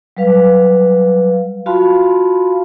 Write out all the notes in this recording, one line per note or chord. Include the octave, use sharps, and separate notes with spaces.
F#3 G3 B4 F5
F4 F#4 F5 A5 B5 C6